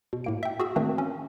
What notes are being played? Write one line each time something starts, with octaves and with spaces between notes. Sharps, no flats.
B2
A2 A#3 D7
E5 G5
F#4 G#4 E6
D#3 E3 A3 A#3 C4 D4
C#4